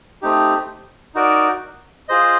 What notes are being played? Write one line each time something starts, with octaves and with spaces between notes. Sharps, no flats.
A3 C4 D#4 G4
D#4 F#4 A#4 D5
F4 G#4 C5 D#5